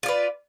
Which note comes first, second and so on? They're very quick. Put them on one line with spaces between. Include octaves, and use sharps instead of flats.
F4 D5 B4